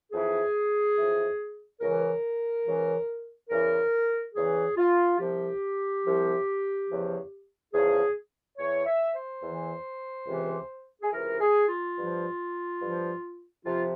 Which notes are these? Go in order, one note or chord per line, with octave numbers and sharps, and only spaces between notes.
F2 E3 G#4
F2 E3
C#2 C#3 E3 A#4
C#2 C#3 E3
E2 C#3 E3 A#4
E2 C#3 E3 G#4
F4
C2 C3 F3 G4
C2 C3 F3
E2 C#3 F3
E2 C#3 F3 G#4
E2 E3 C#5
E5
C5
E2 E3
C#2 C3 E3
G#4
C#2 C3 E3 A#4
G#4
F4
G2 F3
G2 F3
F2 C3 F3 F4